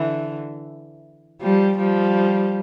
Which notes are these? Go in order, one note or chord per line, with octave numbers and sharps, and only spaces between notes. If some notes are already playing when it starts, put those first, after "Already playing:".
Already playing: D3 E3
F3 G3
F3 G3